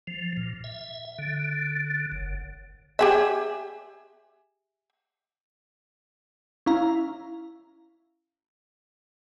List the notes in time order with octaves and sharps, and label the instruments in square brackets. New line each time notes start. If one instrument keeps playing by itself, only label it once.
[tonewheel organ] F3
A#2
E5
D3
F#1
[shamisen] G4 G#4 E5
[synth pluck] C#4 E4 F5 A#5